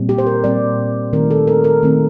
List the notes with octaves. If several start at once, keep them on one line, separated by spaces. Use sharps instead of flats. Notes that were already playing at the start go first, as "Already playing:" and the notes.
Already playing: A#2 G3 C4
G4
C5
A#4
A#2 G3 C4 D5
D#3 A3 C4 A#4
A4
A#4
A#4
D#3 A3 C4